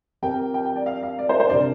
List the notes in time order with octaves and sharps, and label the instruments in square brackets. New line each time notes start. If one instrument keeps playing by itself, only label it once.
[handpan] F3 C4 G4 A#4 [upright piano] G5
[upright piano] G5
G5
D5
F5
F5
D5
C5
C5
[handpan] C3 F3 D4 G4 A#4 [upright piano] D5